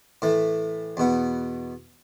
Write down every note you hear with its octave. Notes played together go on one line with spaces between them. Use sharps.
A2 E3 A3
E2 B2 B3